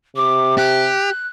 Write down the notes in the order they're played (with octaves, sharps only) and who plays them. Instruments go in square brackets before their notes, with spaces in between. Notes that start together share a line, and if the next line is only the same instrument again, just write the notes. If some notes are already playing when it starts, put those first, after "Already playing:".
[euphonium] C3 [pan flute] D6
[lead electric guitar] G4 [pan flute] F#6